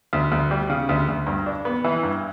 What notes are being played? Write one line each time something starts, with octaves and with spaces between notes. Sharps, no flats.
D2
D2
G3
C#3
D2
D2
G2
D4
B3
E3
G2